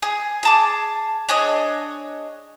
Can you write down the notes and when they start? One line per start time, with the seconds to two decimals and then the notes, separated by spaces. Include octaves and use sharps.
0.02 G#4
0.43 G#4 A5 D6
1.29 D4 G#4 C#5 D#5